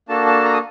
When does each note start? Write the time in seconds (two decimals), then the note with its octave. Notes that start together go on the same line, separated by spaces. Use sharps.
0.09 A#3 D4 F#4 A4 A5
0.26 A5
0.44 A#5
0.53 D#6